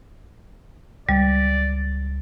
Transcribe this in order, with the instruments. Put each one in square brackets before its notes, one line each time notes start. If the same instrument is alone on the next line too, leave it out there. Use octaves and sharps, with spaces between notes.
[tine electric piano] C#2 [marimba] G3 [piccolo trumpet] D5